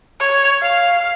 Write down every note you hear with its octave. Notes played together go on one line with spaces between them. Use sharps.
C#5
F5